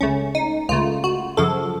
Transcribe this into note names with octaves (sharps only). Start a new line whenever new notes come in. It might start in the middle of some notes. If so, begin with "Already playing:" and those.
C#2 C#3 A3 C#4
D#4
C#2 C#3 A3 F4
F#4
F#2 C#3 F3 A4